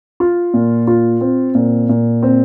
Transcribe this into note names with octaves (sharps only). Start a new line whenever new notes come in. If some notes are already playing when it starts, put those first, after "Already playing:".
F4
A#2
F4
C4
A#2
A#2
C4